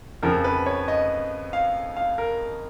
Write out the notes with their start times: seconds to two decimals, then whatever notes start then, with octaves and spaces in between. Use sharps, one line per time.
0.23 F2 C#3 F3 A#4
0.44 B4
0.66 C#5
0.88 D#5
1.53 F5
1.96 F5
2.18 A#4